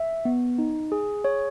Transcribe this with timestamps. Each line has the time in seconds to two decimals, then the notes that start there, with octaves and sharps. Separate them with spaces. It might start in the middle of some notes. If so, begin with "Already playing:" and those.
Already playing: E5
0.25 B3
0.58 D#4
0.92 G#4
1.24 C#5